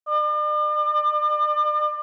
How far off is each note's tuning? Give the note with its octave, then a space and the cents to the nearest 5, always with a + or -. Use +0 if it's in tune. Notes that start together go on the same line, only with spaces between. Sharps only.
D5 +40